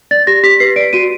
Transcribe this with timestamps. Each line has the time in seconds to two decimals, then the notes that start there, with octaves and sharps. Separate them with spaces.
0.11 D5 A6
0.27 G4 A#6
0.43 G4 B6
0.60 B4 C7
0.76 D5 D7
0.93 F#4 D#7